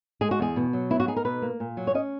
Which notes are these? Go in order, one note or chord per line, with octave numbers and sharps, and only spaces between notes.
G#3 G#4
F#4
E2 G#4
B2
F#3
B3 E4
F#4
D#4 G#4
A#4
B2 B4
A#3
A#2
F#3
C#5
C#4 D#5